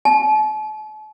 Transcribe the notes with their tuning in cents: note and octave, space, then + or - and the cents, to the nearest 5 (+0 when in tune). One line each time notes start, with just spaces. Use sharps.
A5 -40